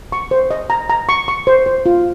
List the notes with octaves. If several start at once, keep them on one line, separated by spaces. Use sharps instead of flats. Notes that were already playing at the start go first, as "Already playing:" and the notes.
C#6
C5
D#5
A#5
A#5
C#6
C#6
C5
C5
F4